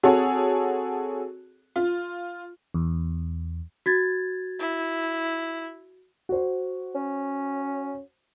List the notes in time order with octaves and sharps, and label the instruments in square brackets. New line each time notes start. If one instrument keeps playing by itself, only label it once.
[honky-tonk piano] C4 F#4 G#4 A4 C#5
F4
[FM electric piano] E2
[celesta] F#4 G#6 A6
[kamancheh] E4
[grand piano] F#4 C5
[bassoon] C#4